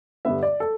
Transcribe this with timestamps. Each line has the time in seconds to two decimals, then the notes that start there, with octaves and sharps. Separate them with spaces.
0.25 G2 D3 B3 E5
0.43 D5
0.60 A4